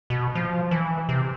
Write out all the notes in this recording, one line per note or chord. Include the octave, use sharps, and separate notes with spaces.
B2
F3
E3
C3